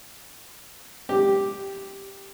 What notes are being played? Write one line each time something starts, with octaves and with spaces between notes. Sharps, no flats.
G4